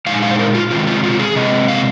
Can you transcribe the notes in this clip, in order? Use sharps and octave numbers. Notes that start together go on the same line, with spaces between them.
A#2 G#3 D#4 F5
G#5
F5
C5
A#4
F4
C3 D#3 G#3 C4 F4
F4
F4
G#4
C3 G#3 C4 D#5
F5